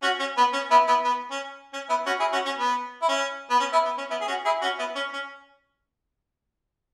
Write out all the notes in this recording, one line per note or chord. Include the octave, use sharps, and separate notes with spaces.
C#4 F#4
C#4
B3
C#4
B3 E4
B3 E4
B3
C#4
C#4
B3 E4
C#4 F#4
E4 G#4
C#4 F#4
C#4
B3
E4
C#4
B3
C#4
B3 E4
B3
C#4
B3 E4
G#4
C#4 F#4
E4 G#4
C#4 F#4
B3 E4
C#4
C#4